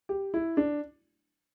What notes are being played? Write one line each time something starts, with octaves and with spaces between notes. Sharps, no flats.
G4
E4
D4